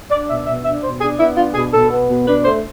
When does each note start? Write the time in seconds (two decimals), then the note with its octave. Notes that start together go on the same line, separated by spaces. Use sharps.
0.11 D4 D5
0.28 B2 E5
0.46 B2 E5
0.64 D4 E5
0.83 B2 C5
1.01 D4 G#4
1.19 B3 E4
1.37 D4 F4
1.54 B2 G#4
1.73 B2 A4
1.90 B3
2.09 B2
2.27 D4 B4
2.45 A3 C5